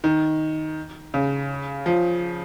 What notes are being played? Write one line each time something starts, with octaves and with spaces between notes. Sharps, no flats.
D#3
C#3
F3